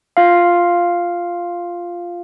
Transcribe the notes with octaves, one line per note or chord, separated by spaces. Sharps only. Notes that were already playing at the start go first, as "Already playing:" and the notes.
F4 F5